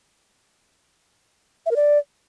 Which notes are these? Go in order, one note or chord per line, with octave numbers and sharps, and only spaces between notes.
E5
A#4
D5